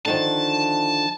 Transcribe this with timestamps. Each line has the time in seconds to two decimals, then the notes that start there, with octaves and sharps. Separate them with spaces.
0.06 D3 D#3 F3 A5